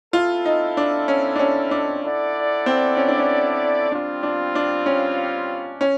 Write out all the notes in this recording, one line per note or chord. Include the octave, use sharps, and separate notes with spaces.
C4 E4 F4 A4
D#4
D4
C#4
D4
C#4
D4
E4 A4 D5 F#5
C4
C#4
D4
C#4
G3 C4 D4 F4
D4
D4
C#4
C#4